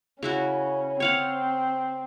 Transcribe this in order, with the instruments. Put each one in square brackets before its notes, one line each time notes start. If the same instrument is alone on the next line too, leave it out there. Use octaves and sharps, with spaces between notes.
[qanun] C#3 E4 F#4 [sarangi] C#4
[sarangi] C4 [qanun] C#5 F5 F#5